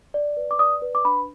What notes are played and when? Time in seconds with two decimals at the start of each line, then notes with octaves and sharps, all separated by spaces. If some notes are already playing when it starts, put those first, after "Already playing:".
0.14 D5
0.37 B4
0.51 D6
0.59 D5 D#6
0.82 B4
0.95 D6
1.05 D4 B5